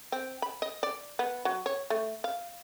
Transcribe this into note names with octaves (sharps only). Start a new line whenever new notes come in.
C4
B5
D#5
D5
B3
F#3
C#5
A3
F5